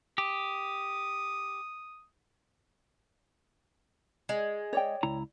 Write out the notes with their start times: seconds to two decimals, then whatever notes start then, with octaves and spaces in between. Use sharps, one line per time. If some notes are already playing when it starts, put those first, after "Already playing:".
0.18 G4 D#6
4.29 G#3
4.73 C#5 D5 G5
5.03 C#2 E4 A#5